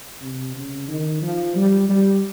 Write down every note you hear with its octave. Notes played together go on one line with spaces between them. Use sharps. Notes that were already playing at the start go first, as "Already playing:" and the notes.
C3
C#3
D#3
F3
G3
G3